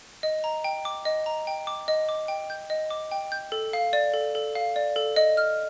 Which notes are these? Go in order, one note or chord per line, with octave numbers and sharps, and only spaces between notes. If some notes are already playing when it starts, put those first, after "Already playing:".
D#5
A#5
G5
D6
D#5
A#5
G5
D6
D#5
D6
G5
G6
D#5
D6
G5
G6
A4
F5
D5
A4
A4
F5
D5
A4
D#5
F6